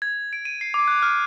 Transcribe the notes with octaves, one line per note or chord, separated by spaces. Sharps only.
G#6
D7
D#7
C7
D6
F#6
F6